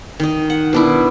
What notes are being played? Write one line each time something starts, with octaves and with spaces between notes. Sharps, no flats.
D#3 D#5
F#5
B2 D4 E4